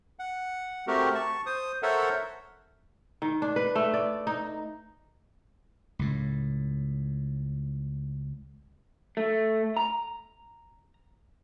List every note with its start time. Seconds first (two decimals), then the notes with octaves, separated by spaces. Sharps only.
0.19 F#5
0.87 A3 C4 F#4 G4 A#4
1.15 A5 C#6
1.46 C5 D#6
1.83 A4 A#4 C5 C#5 E5 F#5
3.22 D#3
3.42 D4
3.56 B4
3.75 A3
3.94 D5
4.27 D#4
5.99 C#2 A2
9.17 A3
9.77 A#5